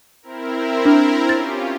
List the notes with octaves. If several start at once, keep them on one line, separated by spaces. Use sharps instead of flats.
C4 E4 A#4
D4
C#4 F4 G4 A6